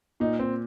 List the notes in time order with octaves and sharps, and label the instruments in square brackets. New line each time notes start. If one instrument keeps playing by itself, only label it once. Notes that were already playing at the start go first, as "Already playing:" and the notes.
[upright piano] A#2 [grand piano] D#4
[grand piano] C4